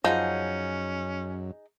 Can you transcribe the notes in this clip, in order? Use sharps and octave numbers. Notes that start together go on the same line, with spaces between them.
F#2 F3 C#4 D#4 G#4 F#5